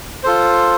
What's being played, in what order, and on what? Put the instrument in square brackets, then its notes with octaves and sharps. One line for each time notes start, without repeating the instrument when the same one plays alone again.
[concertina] F4 A4 C5